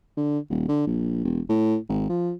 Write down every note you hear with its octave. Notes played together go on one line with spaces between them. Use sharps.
D3
D#1
D3
A#1
E1
A2
G#1
F3